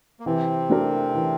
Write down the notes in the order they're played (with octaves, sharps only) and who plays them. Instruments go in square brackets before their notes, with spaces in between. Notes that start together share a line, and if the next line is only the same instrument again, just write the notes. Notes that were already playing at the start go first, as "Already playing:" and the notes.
[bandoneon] A#3
[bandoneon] C3 C4 [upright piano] E3
[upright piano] A3 D4 G4 A#4
E3